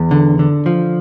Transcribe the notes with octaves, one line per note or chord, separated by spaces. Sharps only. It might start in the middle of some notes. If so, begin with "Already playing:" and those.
Already playing: E2
D3
D3
F3